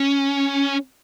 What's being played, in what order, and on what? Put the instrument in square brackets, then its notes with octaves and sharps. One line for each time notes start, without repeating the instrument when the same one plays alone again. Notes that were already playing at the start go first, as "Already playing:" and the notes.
Already playing: [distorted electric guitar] C#4